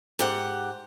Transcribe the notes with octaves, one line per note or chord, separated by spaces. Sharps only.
G#2 G4 F#5